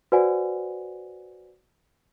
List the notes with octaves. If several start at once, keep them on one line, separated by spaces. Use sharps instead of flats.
F#4 B4 C5 D5 F#5 G#5